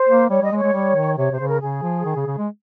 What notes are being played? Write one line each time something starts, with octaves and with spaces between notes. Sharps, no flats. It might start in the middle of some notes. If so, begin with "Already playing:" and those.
Already playing: C5
A#3
G3 C#5
G3 D#5
G#3
C#5
G#3
G3
D#3
C3 C#5
C3 C5
C#3
A#4
C#3 G#4
F3
D#3
C#3
C#3
G#3